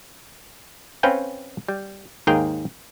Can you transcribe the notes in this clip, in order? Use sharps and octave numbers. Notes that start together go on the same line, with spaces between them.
C4 C#4 B4 F5 G5 G#5
G3
D#2 G#2 G#4 A#4 F5 G5